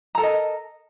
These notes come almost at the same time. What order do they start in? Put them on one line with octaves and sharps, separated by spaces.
A#5 A4 A#4 D#5